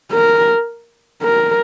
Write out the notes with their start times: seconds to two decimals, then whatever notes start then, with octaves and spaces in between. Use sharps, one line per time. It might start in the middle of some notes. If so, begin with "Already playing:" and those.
0.12 A#4
1.23 A#4